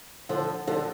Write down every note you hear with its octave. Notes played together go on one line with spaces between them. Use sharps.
D3 F3
D3 F3